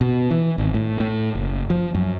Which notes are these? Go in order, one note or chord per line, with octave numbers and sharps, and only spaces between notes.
B2
E3
G#1
A2
A2
F#1
F3
F#2